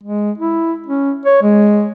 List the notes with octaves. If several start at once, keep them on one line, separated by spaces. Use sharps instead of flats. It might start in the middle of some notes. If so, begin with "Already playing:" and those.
G#3
E4
C#4
C#5
G#3